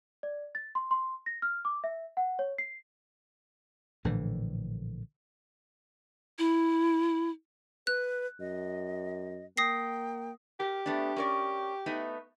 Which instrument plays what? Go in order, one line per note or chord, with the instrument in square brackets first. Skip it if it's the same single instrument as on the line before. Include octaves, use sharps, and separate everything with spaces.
[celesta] D5
A6
C6
C6
A#6
F6
D6
E5
F#5
C#5
C7
[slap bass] A#1 A2 D3 E3
[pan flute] E4
[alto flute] B4 [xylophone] F#6
[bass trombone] F#2 [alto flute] D#5
[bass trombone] A#3 [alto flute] G5 [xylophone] D#6 A#6 C7
[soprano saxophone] G4 [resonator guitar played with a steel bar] A#4
[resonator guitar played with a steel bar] A3 B3 D4
C#4 A#4 D5
A3 B3 D#4